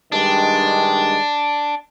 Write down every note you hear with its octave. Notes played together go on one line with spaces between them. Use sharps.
G2 D#3 G#3 D4